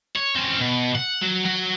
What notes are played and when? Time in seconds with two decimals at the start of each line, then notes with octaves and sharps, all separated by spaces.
0.16 C#5
0.36 C4 C#4
0.60 B2
0.95 F#5
1.21 F#3
1.45 F#3 F#4